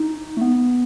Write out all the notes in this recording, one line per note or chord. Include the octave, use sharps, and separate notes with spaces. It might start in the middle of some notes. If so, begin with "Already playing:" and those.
Already playing: D#4
A3
B3